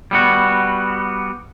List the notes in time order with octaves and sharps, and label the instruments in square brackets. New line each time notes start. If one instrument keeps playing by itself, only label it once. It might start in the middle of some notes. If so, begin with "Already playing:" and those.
[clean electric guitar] G3 B3 F#4